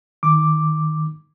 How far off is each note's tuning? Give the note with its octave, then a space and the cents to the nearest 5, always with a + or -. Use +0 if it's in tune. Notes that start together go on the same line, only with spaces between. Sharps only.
D#3 +0 D6 +0